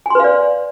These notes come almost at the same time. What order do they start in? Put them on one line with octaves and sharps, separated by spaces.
G#5 C6 B4 F5 D5